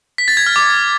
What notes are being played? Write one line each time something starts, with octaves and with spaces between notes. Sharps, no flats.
B6
A6
G#6
F6
D6